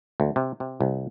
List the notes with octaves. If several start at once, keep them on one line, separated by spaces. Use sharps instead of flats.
D2
C3
C3
C2